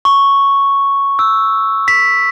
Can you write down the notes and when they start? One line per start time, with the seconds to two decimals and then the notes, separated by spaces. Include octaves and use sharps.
0.05 C#6
1.19 E6
1.88 B6